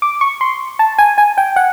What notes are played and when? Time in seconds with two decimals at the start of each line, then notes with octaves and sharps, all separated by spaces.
0.02 D6
0.21 C#6
0.41 C6
0.79 A5
0.98 G#5
1.18 G#5
1.38 G5
1.56 F#5